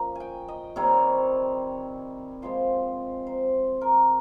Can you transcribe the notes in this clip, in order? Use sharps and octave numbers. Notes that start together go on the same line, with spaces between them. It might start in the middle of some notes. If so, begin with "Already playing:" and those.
Already playing: A#2 F3 A#3 C#4 A#5
G5 G#5
D#5
C3 D#3 G3 C4 C#5
F3 G#3 C4 C5
C5
A#4